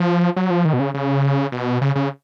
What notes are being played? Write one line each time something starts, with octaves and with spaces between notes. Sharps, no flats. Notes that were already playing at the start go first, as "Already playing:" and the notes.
Already playing: F3
F#3
F3
D#3
B2
C#3
C#3
B2
C#3
C#3